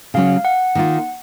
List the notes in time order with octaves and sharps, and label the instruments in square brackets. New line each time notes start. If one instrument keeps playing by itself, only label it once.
[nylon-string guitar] C#3 F#3 C#4 [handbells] F5
[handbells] F#5
[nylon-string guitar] D#3 A#3 F4